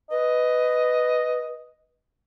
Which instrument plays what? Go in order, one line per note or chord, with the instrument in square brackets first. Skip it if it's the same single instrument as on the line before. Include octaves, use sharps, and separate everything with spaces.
[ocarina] B4 [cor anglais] D#5